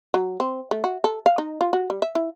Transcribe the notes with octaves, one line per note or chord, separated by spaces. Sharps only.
F#3
C4
A3
F#4
A4
F5
D#4
F4
F#4
G3
E5
E4